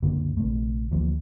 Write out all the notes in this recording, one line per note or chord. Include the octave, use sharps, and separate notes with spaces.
C#2 F#2 D3 A#3
A#1 C3 A3
D2 E3 F3 A#3